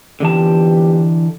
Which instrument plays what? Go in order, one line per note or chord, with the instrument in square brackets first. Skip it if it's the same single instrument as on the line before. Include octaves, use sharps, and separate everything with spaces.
[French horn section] F2 B3 G4 [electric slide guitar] D3 E3 A5